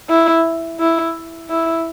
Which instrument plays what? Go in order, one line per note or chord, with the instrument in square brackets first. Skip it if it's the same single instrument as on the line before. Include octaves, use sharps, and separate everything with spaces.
[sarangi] E4
E4
E4